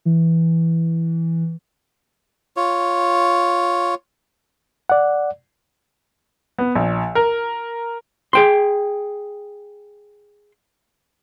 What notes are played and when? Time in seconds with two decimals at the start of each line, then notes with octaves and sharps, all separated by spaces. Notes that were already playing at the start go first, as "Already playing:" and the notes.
0.05 E3
2.56 F4 C#5
4.90 D5 F#5
6.58 B3
6.75 A#1
7.15 A#4
8.33 G#4 G5 C6